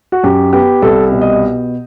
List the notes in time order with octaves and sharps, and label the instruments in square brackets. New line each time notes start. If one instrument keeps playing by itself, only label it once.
[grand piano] F#4
F#2 G4
B3 G4
C2 A4
B2
D#5